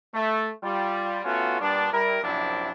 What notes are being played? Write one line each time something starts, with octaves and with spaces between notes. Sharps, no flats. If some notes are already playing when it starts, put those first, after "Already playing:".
A3
G3 F4
A3 B3 C#4 F4 F#4
A#2 G3 B3 D4
G3 E4 A#4
A#1 F#2 C3 F3 D4 E4